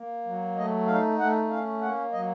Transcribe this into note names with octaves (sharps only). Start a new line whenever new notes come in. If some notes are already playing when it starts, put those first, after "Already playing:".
Already playing: A#3
F#3
A3 D#5
D#4 F5
A3 F#5
C#4 F5
A#3 F#5
F#3 D#5